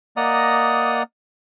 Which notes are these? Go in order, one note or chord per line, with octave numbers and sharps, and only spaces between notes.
A#3 D5 D#5 F#5 A#5 D#6